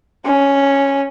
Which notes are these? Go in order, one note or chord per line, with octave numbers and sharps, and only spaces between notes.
C#4